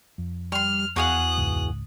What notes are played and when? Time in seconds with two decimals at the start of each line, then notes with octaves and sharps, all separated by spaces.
0.18 F2
0.52 G3 C6 C#6 F6
0.96 E2 F#4 G#4 F5 D#6 F#6
1.37 G#1 C#2 G#2